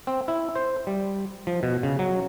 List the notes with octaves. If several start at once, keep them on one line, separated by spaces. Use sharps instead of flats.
C4
E4
C5
G3
F3
B2
C#3
F#3